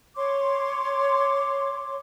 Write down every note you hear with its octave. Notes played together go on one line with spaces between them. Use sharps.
C#5 C6 D6